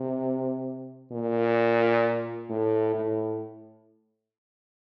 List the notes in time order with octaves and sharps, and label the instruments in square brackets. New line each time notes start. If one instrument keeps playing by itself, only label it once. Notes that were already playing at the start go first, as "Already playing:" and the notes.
Already playing: [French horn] C3
A#2
A2
A2